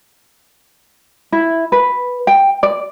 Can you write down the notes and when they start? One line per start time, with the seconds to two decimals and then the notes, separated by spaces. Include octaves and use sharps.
1.32 E4
1.72 B4
2.27 G5
2.63 D5